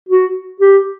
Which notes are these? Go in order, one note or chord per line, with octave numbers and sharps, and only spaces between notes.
F#4
G4